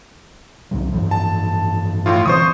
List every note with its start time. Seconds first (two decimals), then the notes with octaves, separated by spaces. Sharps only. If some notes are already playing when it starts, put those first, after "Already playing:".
0.71 C2 D3 F#3
0.92 G2 E3 F3
1.11 A5
2.06 A2 F4
2.26 D3 E3 C4 C5 C#6 D#6